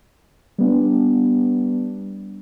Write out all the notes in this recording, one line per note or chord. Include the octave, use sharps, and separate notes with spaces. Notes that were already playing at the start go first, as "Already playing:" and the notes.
G3 B3 D4